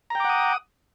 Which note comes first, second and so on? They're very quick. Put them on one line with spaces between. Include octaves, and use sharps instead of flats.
A#5 G5 D6 F#5 D#6